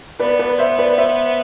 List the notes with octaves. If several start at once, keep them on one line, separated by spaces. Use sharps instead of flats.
B3 B4 D5
B4 D5
C5 E5
B4 D5
C5 E5